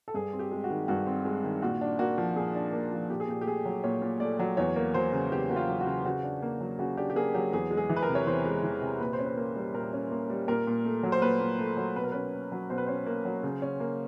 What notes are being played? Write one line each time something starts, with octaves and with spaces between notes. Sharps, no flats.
A4
G2 G#4
C4
G4
G#3
F#4
D#3
G2 F#4
C4
G#3
D#3
A#2 F#4
D4
A#3 F#4
F3
A#2 G#4
D4
A#3
F3
A#2 G4
G#4
A#2 G4
G4
A3 G#4
F#3
A#2 C#5
A#2
A3 D5
F#3
E2 C#5
A#3
F#3 C5
C#3
E2 G4
A#3 F#4
F4
F#3
F#4
C#3
C#3 F#4
D4
A#3
F#3
C#3 F#4
D4 G4
G4
A#3 G#4
F#3 G4
E2 G#4
G#3
G#4
E3
B4
A#4
C3
C#5
E2 C5
G#3
E3
C3
A#2 B4
C5
C#4
B4
A#3
G3
A#2 A#4
C#4
A#3
G3
A#2 A#4
A#2
A3
F#3
C5
A#2 B4
A#2
A3
F#3
B2 B4
A#4
C#4 B4
A#3
F#3
B2 C5
B4
C#4 C5
A#3
F#3
C#3
C#4
A#3